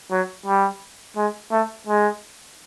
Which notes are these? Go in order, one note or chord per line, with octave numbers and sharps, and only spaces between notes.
F#3
G3
G#3
A3
G#3